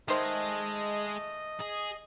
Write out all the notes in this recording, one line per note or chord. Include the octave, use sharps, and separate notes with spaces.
D#3 G#3 A3 C5 D#5
G#4